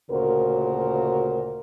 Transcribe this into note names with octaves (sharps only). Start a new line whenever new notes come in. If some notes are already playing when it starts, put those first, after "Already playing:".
D2 A#2 C#3 F#4 A#4 C5